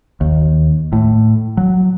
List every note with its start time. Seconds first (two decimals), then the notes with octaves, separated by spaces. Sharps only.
0.21 D#2
0.93 A2
1.57 F#3